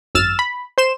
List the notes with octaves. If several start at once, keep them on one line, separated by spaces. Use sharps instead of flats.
G#1 F#2 E6 F6 A6 E7
B5
C5 C6 E7